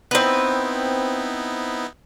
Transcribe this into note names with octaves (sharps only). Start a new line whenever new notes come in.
B3 C4 D#4 E4 B4